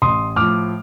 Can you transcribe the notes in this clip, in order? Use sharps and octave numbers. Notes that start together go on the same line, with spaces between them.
A1 C6 D#6
A2 F3 D6 F6